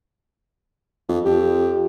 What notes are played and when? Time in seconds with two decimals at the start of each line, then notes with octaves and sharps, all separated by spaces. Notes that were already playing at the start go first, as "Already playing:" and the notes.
1.09 F2
1.25 F2 G4